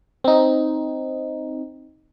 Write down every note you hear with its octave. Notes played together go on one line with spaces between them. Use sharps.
C4 D#4